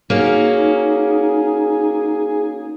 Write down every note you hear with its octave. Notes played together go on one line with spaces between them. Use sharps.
A#3 C#4 D#4 F#4 G#4